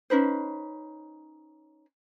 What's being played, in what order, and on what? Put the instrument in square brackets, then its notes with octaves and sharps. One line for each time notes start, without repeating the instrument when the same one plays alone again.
[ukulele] C#4 D#4 B4 C5